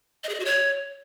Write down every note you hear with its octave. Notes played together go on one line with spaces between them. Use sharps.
D#5
G#4
D#5
F#4
C#5